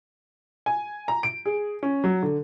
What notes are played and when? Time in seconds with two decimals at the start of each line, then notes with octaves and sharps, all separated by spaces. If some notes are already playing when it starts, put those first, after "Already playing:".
0.66 G#5
1.08 A#5
1.23 D7
1.45 G#4
1.83 C#4
2.04 F#3
2.23 D3